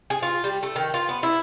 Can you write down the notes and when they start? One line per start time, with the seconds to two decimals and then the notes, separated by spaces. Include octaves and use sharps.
0.10 G#4
0.23 F4
0.44 G3
0.63 A3
0.76 D#3
0.94 F4
1.09 B3
1.23 E4